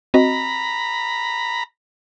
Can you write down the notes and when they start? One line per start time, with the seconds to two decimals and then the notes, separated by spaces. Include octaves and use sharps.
0.14 C4 F#4 D#5 A#5 B5